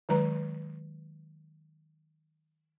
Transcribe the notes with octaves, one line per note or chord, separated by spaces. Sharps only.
D#3 F#3 G#3 B4 A#5